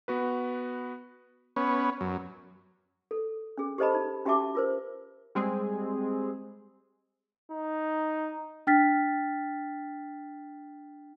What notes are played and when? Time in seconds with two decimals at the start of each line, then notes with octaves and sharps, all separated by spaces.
0.08 B3 F#4 B4
1.56 B3 C#4
2.01 F#2
3.11 A4
3.57 C#4 G#4
3.78 G4 A4 C5 D#5 A5 B5
3.94 D#4
4.25 C#4 F#4 G4 E5 A5 D6
4.55 F4 A#4 C5
5.35 G3 G#3 C4 G#4
7.52 D#4
8.67 D4 G5 F6 A6 B6